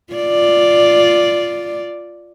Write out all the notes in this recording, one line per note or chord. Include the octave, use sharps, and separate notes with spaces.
F4 D5